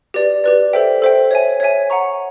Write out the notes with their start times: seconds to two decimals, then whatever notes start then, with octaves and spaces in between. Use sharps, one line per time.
0.14 G4 B4 D5
0.44 G4 B4 D5
0.73 A4 C5 E5 G5
1.02 A4 C5 E5 G5
1.31 C#5 E5 G#5
1.60 C#5 E5 G#5
1.90 F#5 A#5 C#6